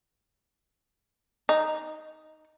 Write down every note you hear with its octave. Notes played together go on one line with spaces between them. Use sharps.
D#4